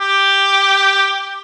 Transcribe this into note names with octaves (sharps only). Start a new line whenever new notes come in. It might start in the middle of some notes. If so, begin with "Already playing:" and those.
G4